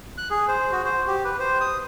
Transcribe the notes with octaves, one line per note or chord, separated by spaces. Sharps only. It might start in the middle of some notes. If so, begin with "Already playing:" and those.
F#6
G#4
C5
F#4
C5
G4
B4
C5
D#6